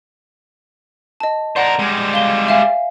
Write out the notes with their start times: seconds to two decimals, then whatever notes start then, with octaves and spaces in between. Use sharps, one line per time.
1.20 D#5 A5
1.56 A#4 C5 D5 F#5
1.79 G3 G#3
2.13 F5 G7
2.48 E5 F5 G#5